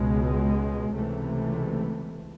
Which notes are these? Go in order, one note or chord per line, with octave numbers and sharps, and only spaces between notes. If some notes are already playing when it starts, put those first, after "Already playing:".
Already playing: C#2 B2 G#3
C#2 C3 E3 A3